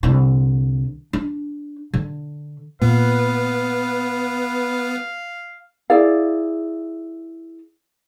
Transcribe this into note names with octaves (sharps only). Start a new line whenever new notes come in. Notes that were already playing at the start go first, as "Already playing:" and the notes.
C2 D3
D4
D3
A#2 B3 B4 F5
E4 G#4 D5 F5